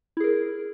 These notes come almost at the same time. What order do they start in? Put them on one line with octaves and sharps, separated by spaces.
E4 G#4 A#4